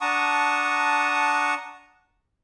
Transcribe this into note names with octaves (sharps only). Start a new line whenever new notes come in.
D4 F#5 A5 A#5 C#6 D#6